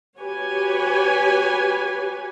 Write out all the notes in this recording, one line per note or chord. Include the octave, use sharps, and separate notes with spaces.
F#4 G4 B4 C#5 G#5